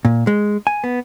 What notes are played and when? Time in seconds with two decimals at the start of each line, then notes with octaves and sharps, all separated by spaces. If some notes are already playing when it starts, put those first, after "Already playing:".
0.05 A#2
0.27 G#3
0.67 G#5
0.84 B3